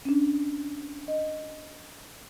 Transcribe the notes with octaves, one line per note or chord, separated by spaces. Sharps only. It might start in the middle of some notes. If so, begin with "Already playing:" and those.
C#4 D4
D#5